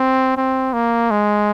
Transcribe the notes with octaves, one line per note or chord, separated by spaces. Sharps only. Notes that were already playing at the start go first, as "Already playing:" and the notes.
Already playing: C4
C4
A#3
G#3